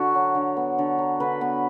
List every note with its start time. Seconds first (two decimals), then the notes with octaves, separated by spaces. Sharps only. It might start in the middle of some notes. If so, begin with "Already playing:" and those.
Already playing: D3 F#4
0.15 F#3
0.35 D3
0.57 B3
0.79 D3
0.99 F#3
1.20 D3 B4
1.41 B3